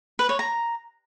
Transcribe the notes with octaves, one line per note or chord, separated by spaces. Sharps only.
B4
C#5
A#5